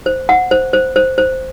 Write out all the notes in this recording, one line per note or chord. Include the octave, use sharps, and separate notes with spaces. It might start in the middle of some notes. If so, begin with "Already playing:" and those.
C5
F#5
C5
C5
C5
C5